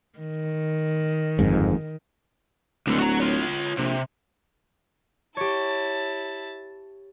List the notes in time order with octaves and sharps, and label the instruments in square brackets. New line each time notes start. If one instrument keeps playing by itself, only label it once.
[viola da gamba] D#3
[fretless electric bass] G1 F2 G#2
[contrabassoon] D1 [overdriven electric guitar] C#2 D3
[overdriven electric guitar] F#4 A#5
F4 C#5
[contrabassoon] A#1 [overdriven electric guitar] C3
[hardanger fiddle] E4 A5 [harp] G4 C#5